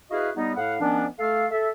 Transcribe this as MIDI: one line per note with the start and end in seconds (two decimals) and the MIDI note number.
0.10 0.30 64
0.10 0.30 66
0.10 0.30 68
0.10 0.30 71
0.10 0.30 75
0.10 0.30 77
0.35 0.52 55
0.35 0.52 59
0.35 0.52 63
0.57 0.75 45
0.57 0.75 77
0.57 0.75 78
0.79 1.06 51
0.79 1.06 53
0.79 1.06 59
0.79 1.06 61
0.79 1.06 62
1.19 1.45 57
1.19 1.45 69
1.19 1.45 77
1.51 1.68 69
1.51 1.68 76